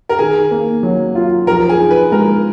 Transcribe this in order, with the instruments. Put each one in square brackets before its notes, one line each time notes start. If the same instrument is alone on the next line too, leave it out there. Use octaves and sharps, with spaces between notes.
[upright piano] A#4
[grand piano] D#3 [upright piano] G#4
[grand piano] A#3
F#3
F4
[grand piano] F3 [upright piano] A#4
[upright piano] G#4
[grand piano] D#4
[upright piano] B4
[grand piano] G#3 [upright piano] A#4